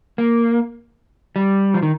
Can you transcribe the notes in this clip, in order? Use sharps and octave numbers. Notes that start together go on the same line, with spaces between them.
A#3
G3
F3
D#3